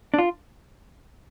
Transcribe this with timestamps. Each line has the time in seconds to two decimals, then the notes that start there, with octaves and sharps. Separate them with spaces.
0.14 D4
0.19 F4